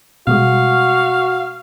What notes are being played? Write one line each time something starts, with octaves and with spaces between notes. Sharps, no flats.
B2 G3 G#3 F#4 F5